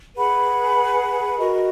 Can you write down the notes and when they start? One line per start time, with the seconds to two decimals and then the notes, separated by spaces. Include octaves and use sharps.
0.16 G#4 B4 F#5 B5
1.38 F#4 A#4 D#5